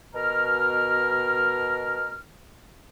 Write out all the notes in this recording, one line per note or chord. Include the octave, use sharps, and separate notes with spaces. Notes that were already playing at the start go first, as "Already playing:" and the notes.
B2 A#4 F6